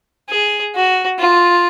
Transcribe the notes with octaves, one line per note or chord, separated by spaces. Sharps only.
G#4
F#4
F4